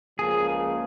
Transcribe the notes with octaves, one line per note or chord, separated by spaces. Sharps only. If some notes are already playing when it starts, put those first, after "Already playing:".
C#2 C#3 F3 A#3 G#4